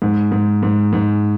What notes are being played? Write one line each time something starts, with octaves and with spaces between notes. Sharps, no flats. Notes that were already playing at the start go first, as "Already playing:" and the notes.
G#2
G#2
G#2
G#2